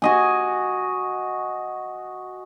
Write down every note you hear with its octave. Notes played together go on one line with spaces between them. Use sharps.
F#4 D#5 G#5